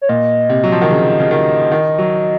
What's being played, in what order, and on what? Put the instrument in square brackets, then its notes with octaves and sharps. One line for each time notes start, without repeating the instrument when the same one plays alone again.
[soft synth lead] C#5
[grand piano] A#2 [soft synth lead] D#5
[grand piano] C3
F#3
F3
D#3
C#3
C#3
D#3
D#3
F#3